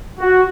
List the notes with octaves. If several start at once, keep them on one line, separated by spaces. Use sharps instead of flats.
F#4